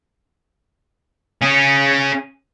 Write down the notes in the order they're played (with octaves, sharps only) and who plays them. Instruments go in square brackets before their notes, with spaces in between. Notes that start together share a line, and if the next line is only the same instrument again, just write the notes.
[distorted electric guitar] C#4 G#4